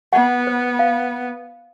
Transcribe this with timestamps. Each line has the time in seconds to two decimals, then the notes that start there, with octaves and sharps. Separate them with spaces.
0.13 B3 F#5
0.47 C5
0.79 F5